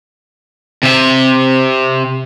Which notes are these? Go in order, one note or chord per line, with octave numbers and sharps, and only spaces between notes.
C3 E5